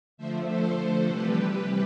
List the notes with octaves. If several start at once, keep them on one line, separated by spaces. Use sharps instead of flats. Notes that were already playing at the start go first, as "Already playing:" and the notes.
D3 F3 A3 C5 E5
A4 C5
A4
C3 E3 G3 G4 B4